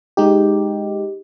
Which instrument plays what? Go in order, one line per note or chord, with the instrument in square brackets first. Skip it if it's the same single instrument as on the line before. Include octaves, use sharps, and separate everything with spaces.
[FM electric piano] G#3 D#4 G4